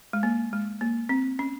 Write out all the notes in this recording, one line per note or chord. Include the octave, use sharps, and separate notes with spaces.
G#3
A#3
G#3
A#3
C4
C#4